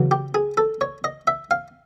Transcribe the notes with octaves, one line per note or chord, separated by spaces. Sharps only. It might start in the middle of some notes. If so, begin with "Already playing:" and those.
Already playing: E2 C#3 F#3
G4
G#4
A4
C#5
D#5
E5
F5